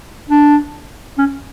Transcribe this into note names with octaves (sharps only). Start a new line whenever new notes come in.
D4
C#4